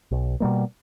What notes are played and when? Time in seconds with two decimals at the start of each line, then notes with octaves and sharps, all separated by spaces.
0.11 B1
0.40 B2 G3 A#3